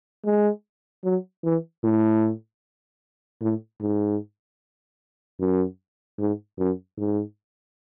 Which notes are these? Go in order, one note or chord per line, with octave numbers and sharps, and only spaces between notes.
G#3
F#3
E3
A2
A2
G#2
F#2
G#2
F#2
G#2